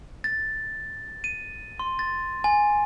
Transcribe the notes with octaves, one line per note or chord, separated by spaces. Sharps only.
A6
D#7
C6
A6
G#5